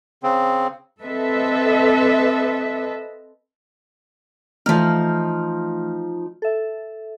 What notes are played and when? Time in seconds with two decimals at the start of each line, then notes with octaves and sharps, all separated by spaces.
0.23 C#3 C4
1.03 C4 A4 B4 D#5 E5
4.66 E3 F3 A3 D#4 F6
6.42 A4 E5